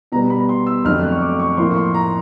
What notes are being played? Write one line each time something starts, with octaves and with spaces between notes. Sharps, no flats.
B2 G3 B3 A#5
B5
C6
E6
F2 D3 F#3 A3 F6
F#6
C#6
D6
C#6
A2 F3 A#3 C6
C#6
C6
A#5